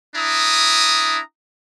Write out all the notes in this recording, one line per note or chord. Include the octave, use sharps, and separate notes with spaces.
D4 E4 A#5 D#6